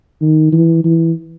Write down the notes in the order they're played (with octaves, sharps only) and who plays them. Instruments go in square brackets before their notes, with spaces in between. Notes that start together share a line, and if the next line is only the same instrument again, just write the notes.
[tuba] D#3
E3
E3